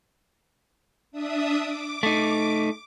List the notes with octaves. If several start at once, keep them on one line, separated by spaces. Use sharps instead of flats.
D4 E5 D#6
D6
A3 D#4